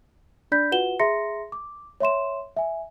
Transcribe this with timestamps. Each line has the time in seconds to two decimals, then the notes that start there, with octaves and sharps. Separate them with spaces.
0.52 D4 D5 B5 G6 B6
0.71 F4 F#4 B4 F#5 E7 G7
1.00 G#4 E5 A#5 C6 A#6 C#7
1.52 D6
2.00 C#5 E5 C6 E7
2.57 E5 G#5